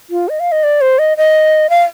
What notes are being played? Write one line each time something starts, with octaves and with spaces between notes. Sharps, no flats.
F4
D#5
F5
D#5
D5
C5
D#5
D#5
F5